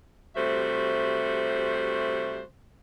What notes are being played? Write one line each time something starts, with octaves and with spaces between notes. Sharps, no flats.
C3 G3 A3 F#4 C5 E5